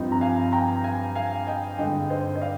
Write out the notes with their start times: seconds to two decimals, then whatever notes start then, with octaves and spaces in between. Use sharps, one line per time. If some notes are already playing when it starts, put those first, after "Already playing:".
Already playing: G2 F3 C4 D#4
0.12 A#5
0.21 F5 G#5
0.53 G5 A#5
0.84 F5 G#5
1.15 F5 G#5
1.47 D#5 G5
1.78 G2 D3 G#3 D#4 D#5 G5
2.10 C5 D#5
2.36 D#5
2.42 D5 F5